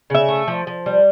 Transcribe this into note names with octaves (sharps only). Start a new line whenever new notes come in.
C#3 E5
A3
F3
F3
G3